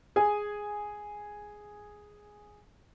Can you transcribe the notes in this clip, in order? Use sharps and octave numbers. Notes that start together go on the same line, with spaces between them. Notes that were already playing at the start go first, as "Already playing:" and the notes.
G#4 G#5